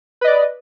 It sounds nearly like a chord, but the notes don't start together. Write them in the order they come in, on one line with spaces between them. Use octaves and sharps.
B4 D#5 D5